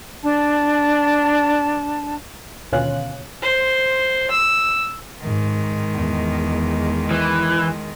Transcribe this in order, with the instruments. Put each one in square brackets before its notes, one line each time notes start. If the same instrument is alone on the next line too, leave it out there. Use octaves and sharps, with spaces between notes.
[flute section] D4 A5
[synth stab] D#2 B2 D3 C#4 F4 F#6
[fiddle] C5
E6
[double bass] G#2 [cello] D#3 G#3
[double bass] E2
[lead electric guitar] E3